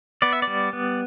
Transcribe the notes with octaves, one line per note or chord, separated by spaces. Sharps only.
B3 D5
E5
D5
G3
B3